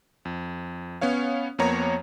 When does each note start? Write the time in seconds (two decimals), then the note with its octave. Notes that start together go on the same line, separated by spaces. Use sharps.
0.25 F2
1.01 B3 C#4 C#5 F5
1.59 F2 A#3 B3 C#5 A#5